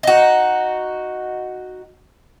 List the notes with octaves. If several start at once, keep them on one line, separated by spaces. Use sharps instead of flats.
D#4 F#4